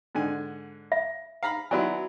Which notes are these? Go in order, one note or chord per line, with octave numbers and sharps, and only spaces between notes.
G#2 D3 G#5
E5
F5 A#5 B5
F#3 B3 E4 F#4 D5 G#5